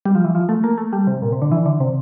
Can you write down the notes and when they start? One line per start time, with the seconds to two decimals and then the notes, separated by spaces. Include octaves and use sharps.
0.06 G3
0.15 F3
0.24 E3
0.35 F3
0.49 A3
0.64 A#3
0.78 A3
0.93 G3
1.07 C3
1.22 A#2
1.32 C3
1.42 D3
1.52 E3
1.66 D3
1.80 C3